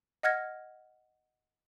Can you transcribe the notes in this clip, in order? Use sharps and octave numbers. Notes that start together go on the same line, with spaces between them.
D#5 F#5 F6 G#6 A#6